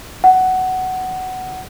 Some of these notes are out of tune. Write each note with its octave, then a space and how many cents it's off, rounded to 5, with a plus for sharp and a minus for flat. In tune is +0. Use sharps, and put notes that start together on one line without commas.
F#5 +10